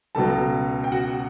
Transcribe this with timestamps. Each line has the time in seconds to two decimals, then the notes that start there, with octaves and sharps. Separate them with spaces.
0.15 C#2 B2 F#3 A4 A5
0.84 G5
0.92 F#4 F#5